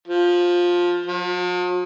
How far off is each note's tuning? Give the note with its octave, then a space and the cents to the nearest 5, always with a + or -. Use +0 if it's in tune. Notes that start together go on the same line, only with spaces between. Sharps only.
F3 +15
F3 +45